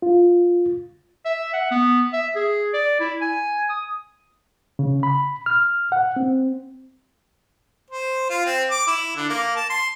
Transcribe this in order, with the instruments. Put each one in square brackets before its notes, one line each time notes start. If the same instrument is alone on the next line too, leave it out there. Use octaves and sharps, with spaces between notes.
[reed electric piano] F4
[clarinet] E5
F#5
B3
E5
G#4
D5
E4
G#5
D#6
[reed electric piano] C#3
B5
F6
F#5
C4
[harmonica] C5
F4
C4
D6
E4
D3
A#3
A5
C6